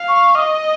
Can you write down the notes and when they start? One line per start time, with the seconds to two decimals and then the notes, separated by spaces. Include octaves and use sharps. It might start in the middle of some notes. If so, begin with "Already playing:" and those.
Already playing: F5
0.08 C#6
0.36 D#5 D#6